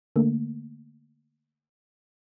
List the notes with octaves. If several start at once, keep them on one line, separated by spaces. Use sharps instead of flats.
D3 A3 A#3